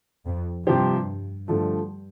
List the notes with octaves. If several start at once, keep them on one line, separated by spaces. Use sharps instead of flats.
F2
G2 C3 F3 C4 G4 C5
G2 D3 F3 A3